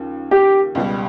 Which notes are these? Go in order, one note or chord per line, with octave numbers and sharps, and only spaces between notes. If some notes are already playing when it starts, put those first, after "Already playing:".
Already playing: D#2 C#3 F3
G4
C#2 B2 G3